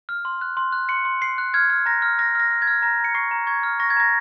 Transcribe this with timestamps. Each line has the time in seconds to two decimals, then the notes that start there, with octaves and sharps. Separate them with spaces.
0.09 F6
0.25 C6
0.41 F#6
0.57 C6
0.72 F#6
0.89 C6 C#7
1.05 C6
1.21 C6 C7
1.38 F#6
1.54 F6 G#6
1.70 F6
1.86 A#5 A#6
2.02 F6
2.19 F6 A#6
2.35 F6 A#6
2.51 F6
2.62 G#6
2.67 F6
2.82 A#5 A#6
3.00 A#5 C#7
3.15 C#6 C7
3.31 A#5
3.47 C#6 G#6
3.63 F6
3.80 C#6 A#6
3.90 G#6
3.97 A#5 A#6